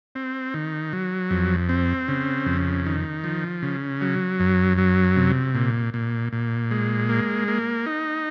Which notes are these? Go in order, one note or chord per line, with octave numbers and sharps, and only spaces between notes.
C4
D#3
F#3
F2
C4
C#3
F2
D#3
F3
C#3
F#3
F#2
F#3
C3
A#2
A#2
A#2
G#3
A#3
A#3
D#4